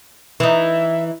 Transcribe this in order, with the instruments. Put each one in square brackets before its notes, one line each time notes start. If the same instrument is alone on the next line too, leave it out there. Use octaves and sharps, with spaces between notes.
[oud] E3 D#4 [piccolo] E5